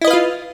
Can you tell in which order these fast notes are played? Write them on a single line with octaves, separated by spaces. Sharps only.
E4 D#5 B4 F5 F4